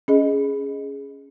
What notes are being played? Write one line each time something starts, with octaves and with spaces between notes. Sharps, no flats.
C#4 G#4 D#5